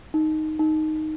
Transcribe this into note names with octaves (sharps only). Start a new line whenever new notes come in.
D#4
D#4